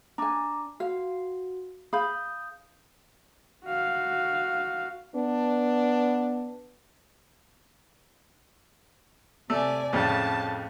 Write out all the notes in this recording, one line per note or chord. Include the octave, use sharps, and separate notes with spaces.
D4 G#5 A#5 D6
F#4 F5
G#4 F5 B5 D#6 G6
F#4 F5
B3 D4
C3 A3 D5 G#5
F2 A2 C#3 A5